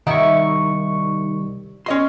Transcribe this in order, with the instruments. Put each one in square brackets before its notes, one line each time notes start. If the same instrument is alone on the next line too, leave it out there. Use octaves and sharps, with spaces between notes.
[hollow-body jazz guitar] C2 D#3 F#5 [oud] G3 E4 [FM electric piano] D#4 C#6
[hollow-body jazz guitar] C#4 D#5 C6